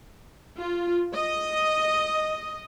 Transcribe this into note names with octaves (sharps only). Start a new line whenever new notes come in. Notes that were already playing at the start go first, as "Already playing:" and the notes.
F4
D#5